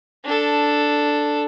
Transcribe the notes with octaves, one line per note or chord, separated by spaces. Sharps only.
D4 A4